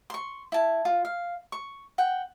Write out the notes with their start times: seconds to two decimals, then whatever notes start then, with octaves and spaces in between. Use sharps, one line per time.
0.10 C6 C#6
0.52 E4 A5
0.85 F4
1.05 F5
1.52 C#6
1.98 F#5 G5